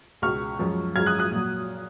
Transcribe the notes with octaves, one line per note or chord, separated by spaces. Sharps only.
C#2 B2 G#3 C#6 F6
F#2 F3 G#3
F#2 F3 G#3 F6 G#6
D#6 F#6
D#6 F#6
A#2 F#3